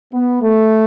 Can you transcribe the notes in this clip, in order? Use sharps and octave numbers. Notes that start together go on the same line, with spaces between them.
B3
A3